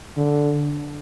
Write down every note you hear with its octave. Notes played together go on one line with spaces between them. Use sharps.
D3